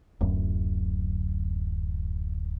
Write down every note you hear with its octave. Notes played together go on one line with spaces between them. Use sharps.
D1 F#2